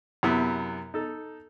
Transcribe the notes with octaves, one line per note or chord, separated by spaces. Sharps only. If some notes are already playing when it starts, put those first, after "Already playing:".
F#2 C3 B3 E4
D#4 A4